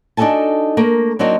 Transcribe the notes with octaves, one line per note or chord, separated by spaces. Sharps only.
D4 D#4 F#4 A4 G#5 A5
A3 A#3 A#4
F#3 A#3 C4 D4 D#4 F#4